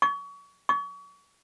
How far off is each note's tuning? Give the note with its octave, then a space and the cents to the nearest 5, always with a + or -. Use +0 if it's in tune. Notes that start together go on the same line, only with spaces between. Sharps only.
C#6 +30
C#6 +35